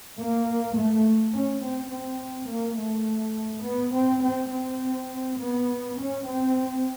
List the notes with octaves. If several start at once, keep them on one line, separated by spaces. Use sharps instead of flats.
A#3
A3
C#4
C4
C4
A#3
A3
B3
C4
C4
C4
B3
C#4
C4